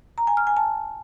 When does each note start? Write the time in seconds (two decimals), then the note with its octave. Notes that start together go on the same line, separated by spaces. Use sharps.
0.18 A#5
0.27 G#5
0.37 F6
0.47 G#5
0.57 A5